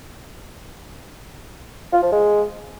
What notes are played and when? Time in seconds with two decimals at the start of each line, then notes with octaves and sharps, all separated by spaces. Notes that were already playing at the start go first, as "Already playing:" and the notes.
1.93 F4
2.02 F3
2.12 G#3